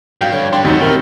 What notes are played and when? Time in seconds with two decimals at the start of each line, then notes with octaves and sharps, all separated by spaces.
0.21 G2 F#3 F5 G5
0.32 D3 C#5
0.53 G2 D4 G4 G5 C6
0.64 F1 D#2 F#3 B3 D#4 C5
0.80 D#2 C3 A3 A#4